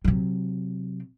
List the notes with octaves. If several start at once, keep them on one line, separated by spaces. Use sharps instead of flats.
C3 F#3